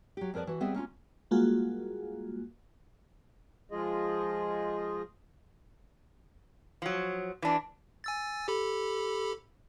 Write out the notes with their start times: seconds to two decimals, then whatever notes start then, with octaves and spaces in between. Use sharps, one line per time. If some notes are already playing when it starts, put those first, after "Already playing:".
0.17 F#3 G4
0.34 F2 G#4 A#4 B4 D5 A5
0.47 E3 F#4
0.60 G3 B3 C4 G#4 D#5 E5
0.74 A#3 C#4 D4 F4
1.31 G3 G#3 A#3 F4 F#4 G#4
3.71 F3 G#3 F4 G#4 D#5
6.82 F3 F#3
7.42 E3 D4
8.04 G#5 E6 A6
8.48 G4 A4 B5